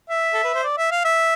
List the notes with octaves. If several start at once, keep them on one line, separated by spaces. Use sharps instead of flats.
E5
A4
B4
C5
D5
E5
F5
E5